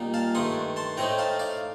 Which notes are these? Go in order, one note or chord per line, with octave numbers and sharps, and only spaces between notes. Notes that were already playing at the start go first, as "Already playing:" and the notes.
Already playing: A#2 G3 A#3 D#4
F5 A5
G2 D#3 A3 D4 C6 D#6
A5 C6
A2 A3 C4 D#4 G5 A#5
F5 A5
D5 F5